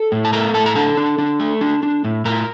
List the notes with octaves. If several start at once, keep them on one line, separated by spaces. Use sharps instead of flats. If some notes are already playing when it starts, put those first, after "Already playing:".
Already playing: A4
A2
A5
A3 A#4 A#5
A2 A4 A5
A#5
D4 A4 A5
D4
D4
A3
D4
D4
A2
A2 A#4 A#5